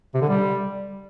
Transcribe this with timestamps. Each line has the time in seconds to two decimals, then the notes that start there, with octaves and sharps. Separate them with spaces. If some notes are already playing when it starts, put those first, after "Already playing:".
0.14 C3
0.22 D3
0.29 G3